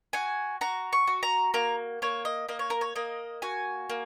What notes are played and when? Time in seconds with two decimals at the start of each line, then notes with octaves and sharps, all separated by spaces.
0.13 F#4 G#5
0.61 F#4 A#5
0.93 C#6
1.07 F#4
1.23 A#5
1.54 A#3 A#5
2.02 A#3 C#5
2.25 D#5
2.49 A#3 D#5
2.59 C#5
2.70 A#4
2.81 C#5
2.96 A#3 D#5
3.42 F#4 G#5
3.89 A#3